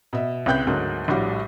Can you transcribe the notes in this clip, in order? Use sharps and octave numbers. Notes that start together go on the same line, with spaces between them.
B2 E5
C2 C#3 B4 G5 F#6 G6
D2 G#2 F#3 A#3
A#1 A2 G3 F#4